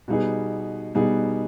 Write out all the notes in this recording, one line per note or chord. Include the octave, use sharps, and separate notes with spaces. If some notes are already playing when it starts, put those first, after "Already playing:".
B2 G3 B3 D#4 G#4
B2 G3 B3 D#4 G#4